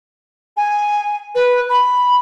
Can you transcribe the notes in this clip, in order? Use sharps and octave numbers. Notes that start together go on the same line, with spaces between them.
G#5
B4
B5